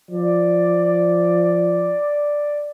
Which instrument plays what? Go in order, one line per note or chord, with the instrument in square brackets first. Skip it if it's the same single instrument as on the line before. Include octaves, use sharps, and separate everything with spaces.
[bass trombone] F3 [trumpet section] D5